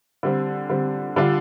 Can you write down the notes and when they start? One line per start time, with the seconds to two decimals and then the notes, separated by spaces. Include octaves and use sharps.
0.23 D3 G3 C4
0.69 D3 G3 C4
1.16 D3 G3 D4 F4